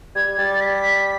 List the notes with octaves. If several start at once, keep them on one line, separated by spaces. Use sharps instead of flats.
G3 G#6
G3 A6
B6